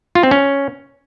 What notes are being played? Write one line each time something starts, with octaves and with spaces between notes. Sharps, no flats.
F4
C4
C#4